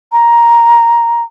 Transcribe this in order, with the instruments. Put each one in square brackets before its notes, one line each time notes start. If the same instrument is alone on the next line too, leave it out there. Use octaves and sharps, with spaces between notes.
[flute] A#5